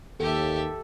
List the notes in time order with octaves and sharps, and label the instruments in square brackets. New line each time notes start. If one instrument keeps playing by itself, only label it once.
[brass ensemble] D#2 [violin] G4 E5 [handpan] A4